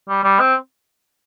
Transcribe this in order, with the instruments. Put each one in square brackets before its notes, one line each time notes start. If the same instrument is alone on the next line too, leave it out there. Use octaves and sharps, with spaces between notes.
[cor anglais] G3
G3
C4